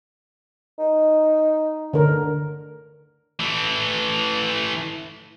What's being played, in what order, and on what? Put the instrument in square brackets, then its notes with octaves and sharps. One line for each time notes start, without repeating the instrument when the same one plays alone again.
[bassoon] D#4
[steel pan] D3 A#4
[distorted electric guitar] E3 A3